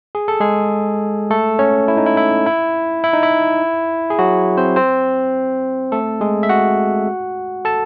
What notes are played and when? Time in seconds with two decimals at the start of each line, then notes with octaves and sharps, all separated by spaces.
0.15 G#4
0.28 A4
0.40 G#3 G#4
1.30 A3 A4
1.59 C#4 C#5
1.88 E4
1.97 D#4
2.06 E4
2.17 E4
2.46 E4
3.04 E4
3.13 D#4
3.23 E4
4.10 G#4
4.19 F#3 F#4
4.57 C4 C5
4.76 C4 C5
5.92 A3 A4
6.21 G#3 G#4
6.43 E5
6.49 F#4 F#5
7.65 A4 A5